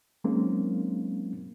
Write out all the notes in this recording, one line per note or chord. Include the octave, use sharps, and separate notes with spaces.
F#3 G#3 A#3 C4 C#4 D#4